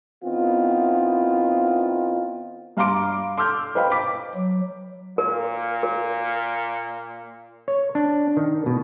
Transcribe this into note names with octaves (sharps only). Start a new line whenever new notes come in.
D#3 B3 C4 E4 F4
G2 F5 A#5 C6 D6 D7
C6 D6 E6 F6 G6
B4 C5 D#5 F5 G5 B5
D6 B6
F#3
A#2 A#4
A#4
C#5
D4
D#3
B2